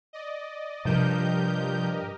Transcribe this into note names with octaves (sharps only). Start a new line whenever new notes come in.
D5 D#5
G2 C3 F3 G4 A#4 D#5 G6